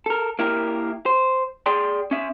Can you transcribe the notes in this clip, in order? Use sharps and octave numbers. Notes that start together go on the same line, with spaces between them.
A4 A#4
A#3 E4 G4 A#4
C5
G#4 D5 G5 C6
C#4 E5